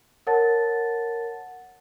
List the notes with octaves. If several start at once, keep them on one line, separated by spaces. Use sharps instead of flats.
A#4 C#5 F#5 A5 A6